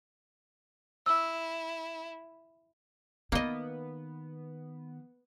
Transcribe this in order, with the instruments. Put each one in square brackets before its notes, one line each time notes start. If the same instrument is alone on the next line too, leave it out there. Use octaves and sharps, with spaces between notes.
[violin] E4 [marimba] E6
[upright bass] D#3 [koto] A#3 D#5 [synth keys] B3